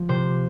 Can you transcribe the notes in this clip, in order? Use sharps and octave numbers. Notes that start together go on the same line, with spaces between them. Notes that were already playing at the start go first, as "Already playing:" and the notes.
Already playing: F3
C3 C5